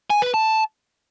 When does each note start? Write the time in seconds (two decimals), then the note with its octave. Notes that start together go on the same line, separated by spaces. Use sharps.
0.10 G#5
0.22 B4
0.34 A5